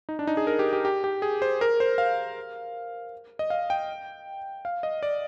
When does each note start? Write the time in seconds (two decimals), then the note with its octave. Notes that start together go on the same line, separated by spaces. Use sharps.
0.09 D#4
0.19 D4
0.27 D#4
0.37 G#4
0.47 A#4
0.59 G4
0.73 G4
0.85 G4
1.04 G4
1.22 G#4
1.42 C5
1.61 A#4
1.80 C5
1.98 F5
3.39 D#5
3.50 F5
3.70 G5
4.65 F5
4.83 D#5
5.03 D5